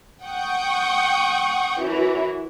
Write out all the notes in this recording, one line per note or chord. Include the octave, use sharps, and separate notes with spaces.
F#5 G5 C#6 D#6 G6
F#2 E3 E4 F#4